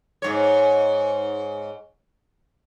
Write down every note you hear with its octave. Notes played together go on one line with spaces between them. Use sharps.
G#2 C#5